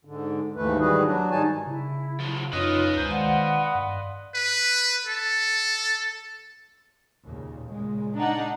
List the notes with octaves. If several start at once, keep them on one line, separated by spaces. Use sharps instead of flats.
G#2 D3
D#2 G#2 E3 A3 B4
D#3 E3 G3 F#4 G#4 B4
F#3 D4 F#4
G#2 D#3 G3 D#4 G#5 A5
C#3 E4
F3 F#3
F#2 C#4 D#4 F4 B4 C#5 D#5
C#2 G#3 C5 A#5 G6
D#3 D5 F5 F#5 C6
G2
B4
A4
D#2 A#2 C#3
A#2 C#3 G#3
D4 D#4 F#5